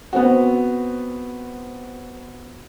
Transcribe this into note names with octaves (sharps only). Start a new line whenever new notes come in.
B3 C4 F#4